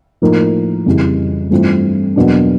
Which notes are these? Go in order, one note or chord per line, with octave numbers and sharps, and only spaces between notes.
A2 F3 A#3 D#4
F2 C#3 E3 G3
G2 E3 A3 C4 F4
E2 B2 F#3 A#3 D4